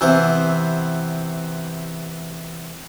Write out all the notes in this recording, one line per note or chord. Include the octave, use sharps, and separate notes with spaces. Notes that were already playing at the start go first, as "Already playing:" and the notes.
C3 E3 B3 C4 E5